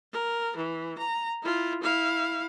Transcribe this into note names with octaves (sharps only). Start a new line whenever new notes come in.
A#4
E3
A#5
E4 F4
E4 F5